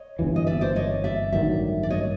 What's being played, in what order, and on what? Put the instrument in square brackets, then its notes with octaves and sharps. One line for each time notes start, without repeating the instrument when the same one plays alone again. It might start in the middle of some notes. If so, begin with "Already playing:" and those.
Already playing: [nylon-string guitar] C#5 D#5
[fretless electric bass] G1 G2 E3
[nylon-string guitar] D#5
D5 E5
C5 D5
C#5 D#5
D5 E5
[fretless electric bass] A1 G2 D#3 F#3 [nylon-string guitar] D5 E5
[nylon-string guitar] D5
C#5 D#5